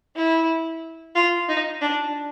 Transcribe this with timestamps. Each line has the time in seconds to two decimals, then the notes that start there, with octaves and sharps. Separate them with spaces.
0.16 E4
1.15 F4
1.48 D#4
1.81 D4